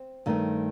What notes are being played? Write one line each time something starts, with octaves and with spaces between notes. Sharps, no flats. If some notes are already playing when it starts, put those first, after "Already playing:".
Already playing: C4
G2 D#3 A3 C4